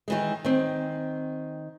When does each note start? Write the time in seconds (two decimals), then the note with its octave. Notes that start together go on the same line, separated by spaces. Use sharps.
0.08 D#3 E3 G#3
0.45 D#3 C4